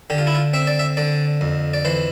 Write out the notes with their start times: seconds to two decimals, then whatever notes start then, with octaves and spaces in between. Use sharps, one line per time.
0.10 D3 G4
0.18 F4
0.27 E4
0.35 F4
0.53 C4 E5
0.67 D5
0.79 E5
0.97 D3 D5
1.41 F2
1.74 D5
1.85 E3 C5